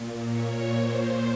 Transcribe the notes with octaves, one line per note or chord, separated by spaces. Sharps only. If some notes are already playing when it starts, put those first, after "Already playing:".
Already playing: A#2
C#5
C5